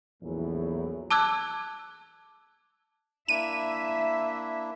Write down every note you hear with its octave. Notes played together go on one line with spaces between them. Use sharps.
A#1 E2 A2 E3 F#3
A5 D6 E6 F#6 G#6
A#3 D4 E4 E5 D#7